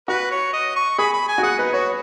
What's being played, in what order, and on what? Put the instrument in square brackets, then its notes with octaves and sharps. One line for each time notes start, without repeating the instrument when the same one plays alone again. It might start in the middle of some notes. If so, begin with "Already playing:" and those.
[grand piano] F#4 [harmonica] B4
[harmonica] C#5
D#5
C#6
[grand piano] G#4 [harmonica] B5
[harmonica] B5
G#5
[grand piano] F#4
[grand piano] G#4 [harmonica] F#5
[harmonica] D#4 [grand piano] B4
[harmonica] F#4 [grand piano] C#5